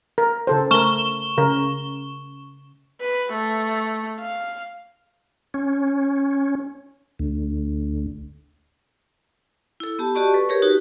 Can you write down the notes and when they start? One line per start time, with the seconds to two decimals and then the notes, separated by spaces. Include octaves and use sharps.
0.18 A#4
0.47 C#3 A4 C5
0.71 A3 A#4 C#6 E7 G7
1.38 C#3 A#4
3.01 B4
3.33 A3
4.20 F5
5.54 C#4
7.19 D2
9.80 E4 A4
9.99 B3 G4 A5
10.15 F#4 G4 D5 D#5 A5 C#6
10.34 A4 B4 C#6
10.49 G4 G#4 A#4 B4 C#5
10.62 D#4 F#4 G4